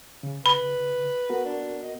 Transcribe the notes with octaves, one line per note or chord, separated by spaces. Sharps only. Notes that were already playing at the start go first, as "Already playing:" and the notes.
C#3
B4 B5
B3 F#4 A#4
D4
D#5